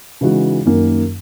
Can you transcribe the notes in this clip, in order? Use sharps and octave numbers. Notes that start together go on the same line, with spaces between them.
C#3 E3 G#3 D#4 F#4
F#2 D#3 A#3